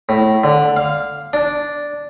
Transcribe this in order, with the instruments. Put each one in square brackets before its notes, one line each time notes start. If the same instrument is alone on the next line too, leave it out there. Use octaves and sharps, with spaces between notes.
[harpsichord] A2
D3
F5
D4